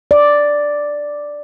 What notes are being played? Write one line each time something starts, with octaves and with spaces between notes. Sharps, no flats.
D5